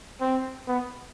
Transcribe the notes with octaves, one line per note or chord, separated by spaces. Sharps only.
C4
B3